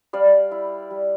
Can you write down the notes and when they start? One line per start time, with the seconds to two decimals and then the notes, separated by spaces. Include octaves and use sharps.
0.13 G3 D5 F5
0.51 E4
0.91 G3